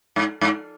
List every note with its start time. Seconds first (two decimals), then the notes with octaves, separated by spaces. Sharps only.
0.16 G#2
0.41 G#2